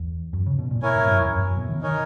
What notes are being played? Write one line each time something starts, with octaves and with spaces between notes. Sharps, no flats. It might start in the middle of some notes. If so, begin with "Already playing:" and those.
Already playing: E2
F#2
C#3
B2
A#2
B2 E4 A#4 C#5 G#5
G#2
F#2
E2
F#2
F#2
B2
D#3
D#3 D#4 A#4 C#5 G#5